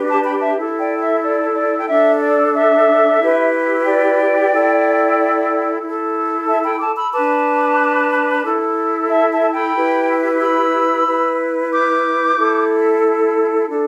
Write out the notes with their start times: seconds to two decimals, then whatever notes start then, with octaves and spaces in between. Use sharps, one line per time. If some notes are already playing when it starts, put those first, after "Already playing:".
Already playing: D4 G4 B4
0.08 A5 D6
0.24 G5 B5
0.41 E5 A5
0.57 E4 A4
0.79 D5 G5
1.01 E5
1.23 D5
1.55 D5
1.79 G5
1.88 D4 A4 E5
2.21 D5
2.54 E5
3.20 E4 G4 B4
3.85 D5 G5
4.51 E4 A4
5.82 E4 A4
6.48 E5 A5
6.63 G5 B5
6.74 B5
6.81 A5 D6
6.97 B5 E6
7.13 D4 B4 A5 D6
8.45 E4 A4
9.10 E5 A5
9.32 E5 A5
9.42 A5
9.53 G5 B5
9.75 E4 G4 B4
10.41 B5 E6
11.07 E4 B4
11.72 D6 G6
12.38 E4 A4
13.69 D4 A4